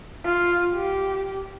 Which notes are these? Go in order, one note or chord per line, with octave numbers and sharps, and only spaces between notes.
F4
G4